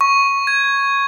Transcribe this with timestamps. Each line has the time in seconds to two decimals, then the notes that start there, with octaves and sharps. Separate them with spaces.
0.01 C#6
0.47 G#6